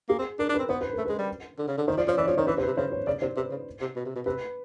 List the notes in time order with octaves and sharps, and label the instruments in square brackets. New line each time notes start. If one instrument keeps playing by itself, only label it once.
[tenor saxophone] A#3 [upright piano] G#4
[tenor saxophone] C4
[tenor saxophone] D4 [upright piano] A#4
[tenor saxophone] D4
[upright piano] B4
[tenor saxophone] C4
[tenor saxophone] B3 [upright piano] C5
[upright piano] B4
[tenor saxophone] A3 [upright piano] A#4
[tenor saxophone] G#3 [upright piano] B4
[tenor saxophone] G3
D3
C#3
D3
[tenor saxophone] D#3 [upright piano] C5
[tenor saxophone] F3 [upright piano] D5
[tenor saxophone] F3 [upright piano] C#5
[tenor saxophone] E3 [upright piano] D5
[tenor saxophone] F3 [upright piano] C#5
[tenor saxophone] D#3 [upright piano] C5
[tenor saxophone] E3 [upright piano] B4
[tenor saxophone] C3 [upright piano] C5
[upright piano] B4
[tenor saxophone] C3
[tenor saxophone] C#3 [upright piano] C5
[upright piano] C#5
[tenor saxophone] C#3 [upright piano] D5
[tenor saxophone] C3 [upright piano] C5
[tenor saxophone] C3 [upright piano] B4
[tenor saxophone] C#3
C3
B2
C3
B2
[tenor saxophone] C3 [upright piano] B4